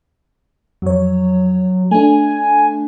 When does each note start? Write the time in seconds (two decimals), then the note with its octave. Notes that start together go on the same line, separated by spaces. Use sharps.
0.82 F2 F#3 C#5
1.91 A3 D4 G#5